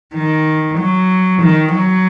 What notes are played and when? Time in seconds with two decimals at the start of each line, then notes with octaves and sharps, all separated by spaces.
0.14 D#3
0.78 F#3
1.42 D#3
1.73 F#3